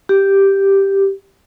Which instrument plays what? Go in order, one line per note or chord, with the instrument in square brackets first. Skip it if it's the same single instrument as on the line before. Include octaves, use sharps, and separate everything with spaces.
[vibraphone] G4